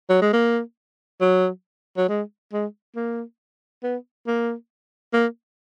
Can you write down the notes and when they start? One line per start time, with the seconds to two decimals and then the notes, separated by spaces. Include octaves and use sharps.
0.10 F#3
0.22 G#3
0.33 A#3
1.21 F#3
1.97 F#3
2.09 G#3
2.53 G#3
2.96 A#3
3.83 B3
4.27 A#3
5.13 A#3